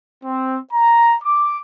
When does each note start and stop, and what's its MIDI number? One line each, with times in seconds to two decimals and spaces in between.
0.23 0.58 60
0.72 1.16 82
1.24 1.58 86